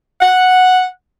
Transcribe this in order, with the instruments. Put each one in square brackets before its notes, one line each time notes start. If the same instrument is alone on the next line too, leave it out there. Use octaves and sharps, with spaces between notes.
[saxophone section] F#5